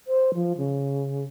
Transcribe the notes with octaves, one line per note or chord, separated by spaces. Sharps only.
C5
F3
C#3